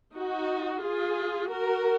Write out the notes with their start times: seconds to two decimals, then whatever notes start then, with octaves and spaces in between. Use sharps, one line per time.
0.15 D#4 F#4
0.83 F4 G#4
1.50 F#4 A#4